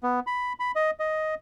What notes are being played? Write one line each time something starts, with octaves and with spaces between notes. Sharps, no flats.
B3
B5
B5
D#5
D#5